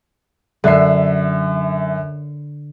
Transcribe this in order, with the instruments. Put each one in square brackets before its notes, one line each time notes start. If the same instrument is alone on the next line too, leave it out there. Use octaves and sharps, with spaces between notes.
[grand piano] F#2 E5 C7 [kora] D3